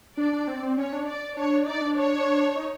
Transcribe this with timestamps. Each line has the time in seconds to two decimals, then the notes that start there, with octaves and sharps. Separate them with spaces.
0.17 D4 D5
0.33 D4
0.47 C4
0.63 C4
0.77 C#4 C#5
0.92 D4
1.07 D5
1.37 D4 C#5
1.66 D#4 D5
1.81 D4
1.96 C#5
2.55 D#4